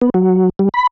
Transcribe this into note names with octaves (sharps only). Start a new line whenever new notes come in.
B3
F#3
G3
B5